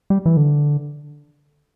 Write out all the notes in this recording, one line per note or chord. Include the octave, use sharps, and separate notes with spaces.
G3
E3
D3